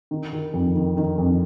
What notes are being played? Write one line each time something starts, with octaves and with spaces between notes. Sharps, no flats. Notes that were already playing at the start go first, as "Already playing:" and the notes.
D#3
D#3
F2
D#3
D#3
F2